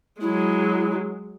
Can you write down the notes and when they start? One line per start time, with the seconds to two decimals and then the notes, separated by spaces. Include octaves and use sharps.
0.21 F#3 G#3 E4